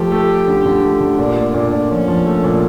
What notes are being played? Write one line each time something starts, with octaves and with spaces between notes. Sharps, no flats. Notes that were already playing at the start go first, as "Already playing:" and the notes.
Already playing: F3 A3 G4
A3
A3
D3
D3
A3
D3
A#2 D4
A3
A#2
A#2
F3 C#4
F3
A3
A#2